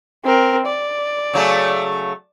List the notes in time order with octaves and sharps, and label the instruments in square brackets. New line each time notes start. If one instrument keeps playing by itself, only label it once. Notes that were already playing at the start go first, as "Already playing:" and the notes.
[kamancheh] C4 A#4
D5
[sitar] C#3 F#3 A3